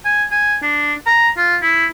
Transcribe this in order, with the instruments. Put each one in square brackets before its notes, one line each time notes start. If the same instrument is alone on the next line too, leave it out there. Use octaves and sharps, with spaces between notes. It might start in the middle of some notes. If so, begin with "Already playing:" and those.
[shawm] G#5
G#5
D4
A#5
F4
E4